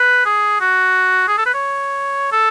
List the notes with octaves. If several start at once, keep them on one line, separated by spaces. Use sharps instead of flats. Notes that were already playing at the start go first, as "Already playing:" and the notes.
Already playing: B4
G#4
F#4
G#4
A4
B4
C#5
A4